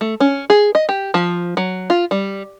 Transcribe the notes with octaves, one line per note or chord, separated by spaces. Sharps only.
A3
C#4
G#4
D#5
G4
F3
F#3
F4
G3